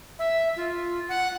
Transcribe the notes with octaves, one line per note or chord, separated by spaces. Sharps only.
E5
F4
F#5